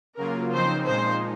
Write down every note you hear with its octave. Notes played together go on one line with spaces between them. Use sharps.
C#3 F#3 A#3 F4 A#4
C#3 F3 C4 D#4 C5
A#2 F3 G#3 D#4 C5